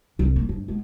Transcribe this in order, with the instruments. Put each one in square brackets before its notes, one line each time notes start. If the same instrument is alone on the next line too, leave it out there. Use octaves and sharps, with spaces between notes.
[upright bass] C2
A#3
G2
G#3 B3